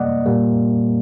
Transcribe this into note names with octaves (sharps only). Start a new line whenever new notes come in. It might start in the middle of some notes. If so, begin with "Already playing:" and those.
Already playing: C3 G3 A#3 D5 D#5 F#5
A#2 G3 A#3